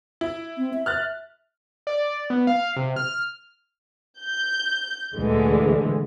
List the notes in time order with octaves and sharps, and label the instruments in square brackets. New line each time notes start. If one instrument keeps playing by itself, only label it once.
[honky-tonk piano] E4
[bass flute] C4
E5
[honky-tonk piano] F6 F#6 A6
[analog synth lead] D5
B3
F5
C3
F6
[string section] G6
D2 A#2 D3 E3 G#3 A3